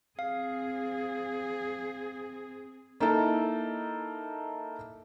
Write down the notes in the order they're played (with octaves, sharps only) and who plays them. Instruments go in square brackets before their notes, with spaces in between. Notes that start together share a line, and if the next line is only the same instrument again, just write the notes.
[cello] C4 G#4 [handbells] F5
[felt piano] A#3 D#4 E4 A4